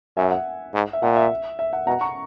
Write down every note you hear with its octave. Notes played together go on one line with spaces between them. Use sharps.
F#2 E5 G#5
F#5
G#2
E5
A#2 F#5
E5
E5
F#5
B2 F#5 A#5
A#5 C#6